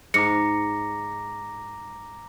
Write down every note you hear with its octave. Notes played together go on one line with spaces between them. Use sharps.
G#2 A#5 D6 A#6 C#7